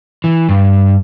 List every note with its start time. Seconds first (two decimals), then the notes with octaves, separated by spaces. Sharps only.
0.24 E3
0.49 G2